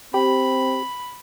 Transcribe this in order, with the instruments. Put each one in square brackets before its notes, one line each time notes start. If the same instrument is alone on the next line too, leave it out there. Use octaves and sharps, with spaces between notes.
[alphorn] C4 [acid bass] G4 [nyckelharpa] B5